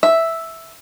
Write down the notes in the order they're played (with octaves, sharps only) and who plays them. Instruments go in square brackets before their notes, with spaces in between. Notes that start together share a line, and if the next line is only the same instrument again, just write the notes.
[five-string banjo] E5